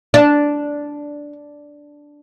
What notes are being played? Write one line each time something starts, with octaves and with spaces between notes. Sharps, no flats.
D4